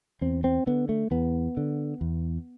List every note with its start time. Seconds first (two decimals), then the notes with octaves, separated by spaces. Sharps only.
0.21 E2 C4
0.44 C4
0.67 D3 B3
0.89 A3
1.11 E2 B3
1.57 D3
2.01 E2